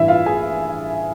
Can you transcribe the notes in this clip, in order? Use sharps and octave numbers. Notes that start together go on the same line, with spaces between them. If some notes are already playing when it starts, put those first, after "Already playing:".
Already playing: A1 G2 E3 E4 E5
F4 F5
G#4 G#5